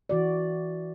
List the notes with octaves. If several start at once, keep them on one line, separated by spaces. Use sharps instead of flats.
E3 F#4 D5